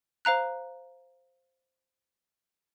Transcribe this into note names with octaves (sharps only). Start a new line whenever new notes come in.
C5 F5 A#5 F#6